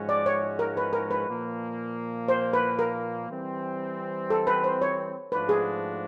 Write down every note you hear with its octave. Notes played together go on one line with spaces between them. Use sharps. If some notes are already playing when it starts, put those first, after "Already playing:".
Already playing: G#2 F3 G#3 C#4 F#4
D5
C#5
A#4
B4
A#4
B4
A#2 F3 A#3
C5
B4
A#4
E3 G3 C4
A4
B4
C5
C#5
G#2 F3 A3 D4 F#4 B4
G#4